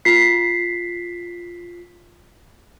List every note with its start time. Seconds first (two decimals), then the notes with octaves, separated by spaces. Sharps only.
0.05 F4 B6 C7